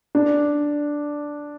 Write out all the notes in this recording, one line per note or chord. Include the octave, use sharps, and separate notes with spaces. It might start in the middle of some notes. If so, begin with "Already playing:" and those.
D4